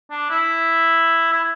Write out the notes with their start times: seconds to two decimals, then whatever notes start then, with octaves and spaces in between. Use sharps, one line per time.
0.11 D4
0.30 E4
1.32 E4